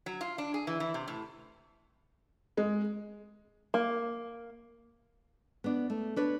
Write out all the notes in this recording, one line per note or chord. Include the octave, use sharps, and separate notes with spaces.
F#3
F4
D4
G#4
E3
E3
C3
A2
G#3
A#3
B3 D4
A3
D4 B4 C#5